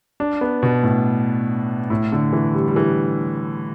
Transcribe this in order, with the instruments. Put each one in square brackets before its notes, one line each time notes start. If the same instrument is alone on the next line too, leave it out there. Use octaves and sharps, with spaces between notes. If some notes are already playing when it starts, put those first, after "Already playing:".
[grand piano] D4
B3
B2
A2
A2
D3
E3
G3
G3
E3